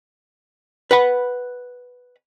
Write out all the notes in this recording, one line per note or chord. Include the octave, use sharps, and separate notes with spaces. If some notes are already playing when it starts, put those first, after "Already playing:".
B4 F#5 B5